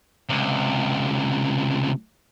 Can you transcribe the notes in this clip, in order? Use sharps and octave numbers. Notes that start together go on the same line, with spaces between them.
C#2 C3